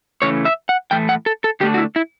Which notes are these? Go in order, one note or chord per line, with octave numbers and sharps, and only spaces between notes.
C#3 E3 A3 C#4 C#5
E5
F#5
A2 E3 A3 G5
F#5
A4
A4
D3 A3 D4 G4
F#4
E4
E4